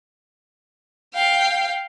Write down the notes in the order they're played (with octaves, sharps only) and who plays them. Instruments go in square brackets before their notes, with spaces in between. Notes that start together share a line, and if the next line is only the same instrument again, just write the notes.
[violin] F5 G5